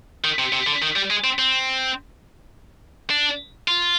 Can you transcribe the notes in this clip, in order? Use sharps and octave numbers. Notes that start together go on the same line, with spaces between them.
D#3
C3
C3
D3
D#3
G3
G#3
C4
C4
D4
F4